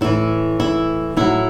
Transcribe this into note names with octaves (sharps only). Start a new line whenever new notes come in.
A2 E3 E4
E4
A2 F#3 E4